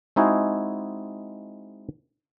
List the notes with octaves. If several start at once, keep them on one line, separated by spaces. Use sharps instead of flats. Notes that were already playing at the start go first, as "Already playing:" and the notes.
G#3 C4 D#4 E4 F#4 G#4